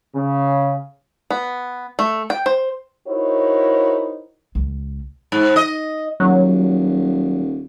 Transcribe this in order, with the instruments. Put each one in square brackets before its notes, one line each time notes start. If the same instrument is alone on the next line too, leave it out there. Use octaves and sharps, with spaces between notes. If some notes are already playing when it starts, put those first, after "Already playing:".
[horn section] C#3
[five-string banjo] B3
A3
G5
C5
[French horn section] D#4 E4 F#4 A#4 C5 C#5
[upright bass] C#2
[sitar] G#2
D#5
[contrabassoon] D#1 [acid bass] F#3